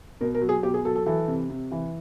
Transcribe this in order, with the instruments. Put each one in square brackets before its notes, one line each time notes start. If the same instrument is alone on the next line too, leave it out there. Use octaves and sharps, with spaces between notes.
[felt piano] B2 A#4
A#4
F#3
G#4
B2 G4
G#4
F#3 A4
A4
E3 A4
C3
C3
E3